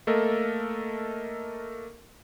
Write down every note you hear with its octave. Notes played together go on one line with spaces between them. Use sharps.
A3 A#3 A4 A#4 D#5